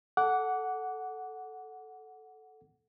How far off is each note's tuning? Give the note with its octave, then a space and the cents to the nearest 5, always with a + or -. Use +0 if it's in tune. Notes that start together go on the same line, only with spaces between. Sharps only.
A4 -10 F#5 +0 D6 -25